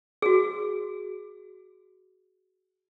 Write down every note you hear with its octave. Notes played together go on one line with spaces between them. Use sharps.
F#4 G#4